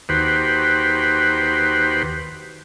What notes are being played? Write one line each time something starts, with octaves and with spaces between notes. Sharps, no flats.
D#2 F#4 G4 B4 C5